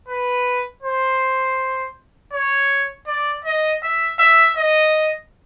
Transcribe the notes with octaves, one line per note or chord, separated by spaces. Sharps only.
B4
C5
C#5
D5
D#5
E5
E5
D#5